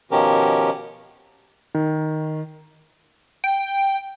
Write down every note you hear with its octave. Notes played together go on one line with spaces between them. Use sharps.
B2 D#3 F3 C#4 G4 A#4
D#3
G5